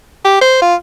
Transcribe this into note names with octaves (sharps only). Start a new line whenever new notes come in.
G4
C5
F4